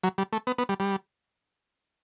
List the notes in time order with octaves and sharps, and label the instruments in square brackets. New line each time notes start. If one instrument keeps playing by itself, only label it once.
[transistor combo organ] F#3
G3
A3
B3
B3
G3
G3